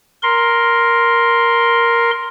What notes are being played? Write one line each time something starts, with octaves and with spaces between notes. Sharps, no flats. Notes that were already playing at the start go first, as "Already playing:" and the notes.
A#4 C6